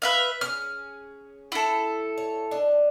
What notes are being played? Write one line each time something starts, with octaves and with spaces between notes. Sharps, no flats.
B4 E5 F5
C#4 G#4 F6
E4 A4
C#5
D4 D#5